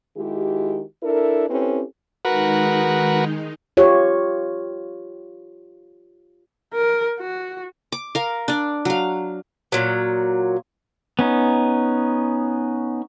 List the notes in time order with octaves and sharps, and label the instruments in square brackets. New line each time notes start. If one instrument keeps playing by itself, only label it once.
[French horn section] D#3 G#3 E4 F#4 G4
D4 E4 A4 A#4
C4 C#4 E4 G4 A4 B4
[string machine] D#3 G#3 D#4 [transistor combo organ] F#4 A#4 B4
[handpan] F4 G4 C#5
[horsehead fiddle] A#4
F#4
[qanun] D6
A#4 F5
D4 D5
F#3 F5
[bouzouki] A#2 F#3
[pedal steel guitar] B3 C#4 D#4